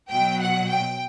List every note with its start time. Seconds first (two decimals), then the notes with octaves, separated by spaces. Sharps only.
0.11 B2 F#3 G5
0.41 F#5
0.70 G5